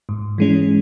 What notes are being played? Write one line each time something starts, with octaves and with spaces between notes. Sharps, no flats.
G#2
E3 G#3 C#4